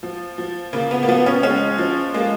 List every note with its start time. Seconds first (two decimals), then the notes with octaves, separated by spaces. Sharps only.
0.03 F3
0.38 F3
0.73 C#3 A#3
0.91 B3
1.03 A#3
1.08 F3 B3
1.26 C#4
1.43 G#3 C#4
1.79 F3
2.14 G#3 A#3